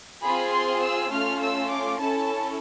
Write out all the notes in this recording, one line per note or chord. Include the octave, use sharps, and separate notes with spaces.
C4 F4 G#4 B5
C6
E6
A3 C#4 F4 F6
E6
D6
C#4 E4 A4 A5